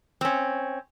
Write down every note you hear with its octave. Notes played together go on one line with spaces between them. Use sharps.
C4 C#4